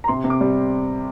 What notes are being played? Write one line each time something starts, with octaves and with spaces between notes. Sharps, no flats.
A#5
C3 C6
C3
D6
G3